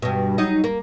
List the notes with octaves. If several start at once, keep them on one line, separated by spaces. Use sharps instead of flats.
G2 B2
F#3 D#4 D#5
A#3